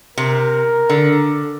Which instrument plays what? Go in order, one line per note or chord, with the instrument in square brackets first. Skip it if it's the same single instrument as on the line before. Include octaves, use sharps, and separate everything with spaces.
[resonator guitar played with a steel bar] C3 [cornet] A#4
[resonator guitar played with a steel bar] D3